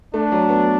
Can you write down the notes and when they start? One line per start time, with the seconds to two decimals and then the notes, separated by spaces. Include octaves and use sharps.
0.14 A3 D4
0.32 F#3
0.49 B3